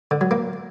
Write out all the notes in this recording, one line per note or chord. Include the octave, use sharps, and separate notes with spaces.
D3
F#3
A#3